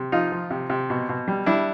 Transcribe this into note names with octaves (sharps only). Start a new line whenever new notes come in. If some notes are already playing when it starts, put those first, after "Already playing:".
Already playing: C3
F3 D#4 F4
F3
C3
C3
B2
B2
G3
G3 D4 E4